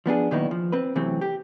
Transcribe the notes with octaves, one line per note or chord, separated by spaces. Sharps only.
F3 B3 D4 G#4
A#2 D#3 F#3 B3 D#4 E4
F3
C4 B4
C3 E3 F#3 A3 C4
G4